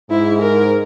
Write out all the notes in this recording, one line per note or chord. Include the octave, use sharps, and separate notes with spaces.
G#2 E4
A#4